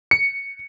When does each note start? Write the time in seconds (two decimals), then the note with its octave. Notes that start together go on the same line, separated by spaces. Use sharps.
0.11 C#7